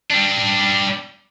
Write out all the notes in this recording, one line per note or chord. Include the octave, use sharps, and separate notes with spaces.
G3 D4